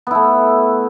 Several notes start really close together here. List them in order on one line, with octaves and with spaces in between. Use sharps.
B3 E4 A3